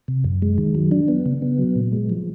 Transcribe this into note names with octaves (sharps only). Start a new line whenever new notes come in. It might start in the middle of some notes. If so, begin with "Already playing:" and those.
C3
F#2
G#3
D#3
F#3
D4
B3
C#3
B3
F#3
A#2
G#3
F3